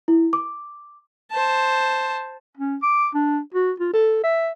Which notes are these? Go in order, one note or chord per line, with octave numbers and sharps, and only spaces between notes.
E4
D6
C5 A5
C#4
D6
D4
F#4
F4
A4
E5